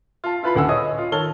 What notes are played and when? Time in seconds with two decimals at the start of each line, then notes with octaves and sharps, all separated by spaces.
0.24 F4 A5
0.43 E4 F4 B4 A5 B5
0.55 D1 D2 C#3 F#5 G#5 E6
0.69 C#5 D#5 D#6 E6
0.98 F4
1.12 D#3 A4 C#5 A5 F6 G7